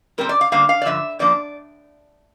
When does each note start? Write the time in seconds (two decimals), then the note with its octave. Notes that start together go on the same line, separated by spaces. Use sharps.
0.18 A#2 G3 C4 A#4
0.29 D5
0.41 F5
0.52 D3 G3 A#3 D4 F5
0.69 F5
0.82 D5
0.86 G2 D3 F3 E5
1.19 A#2 F3 A#3 D4 D5